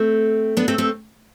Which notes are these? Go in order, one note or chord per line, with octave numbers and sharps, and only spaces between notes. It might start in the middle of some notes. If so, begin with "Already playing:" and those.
Already playing: A3 C4
B3 D4
A3 C4
A3 C4